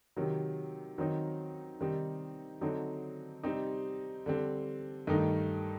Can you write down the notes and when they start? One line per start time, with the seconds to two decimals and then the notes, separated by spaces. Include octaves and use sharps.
0.16 C3 D#3 F#3
0.98 D#3 F#3 C4 D#4
1.80 C3 D#3 G3 C4 D#4
2.61 D3 F#3 C4 D#4
3.43 C3 G3 C4 D#4
4.26 D3 G3 C4
5.07 G2 D#3 A3 D#4